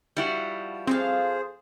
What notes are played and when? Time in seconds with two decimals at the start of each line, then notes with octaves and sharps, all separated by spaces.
0.17 F3 G3 B3 E4 F#4
0.87 F3 C4 G#4 A4 C5 F5